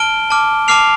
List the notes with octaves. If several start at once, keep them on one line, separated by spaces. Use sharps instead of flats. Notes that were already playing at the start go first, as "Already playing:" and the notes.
Already playing: A5 F6 D7 G7
A5 D6 F6
A5 D6 F6 C7 F7